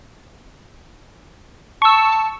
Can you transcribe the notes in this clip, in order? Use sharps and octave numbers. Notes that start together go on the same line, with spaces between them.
A5 C#6 E6